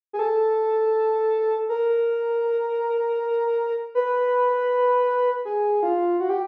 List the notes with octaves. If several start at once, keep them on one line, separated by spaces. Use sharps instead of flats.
G#4
A4
A#4
B4
G#4
F4
F#4
G4